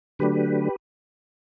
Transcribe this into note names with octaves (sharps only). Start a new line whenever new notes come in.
D3 F#3 A3 D4 G4 B4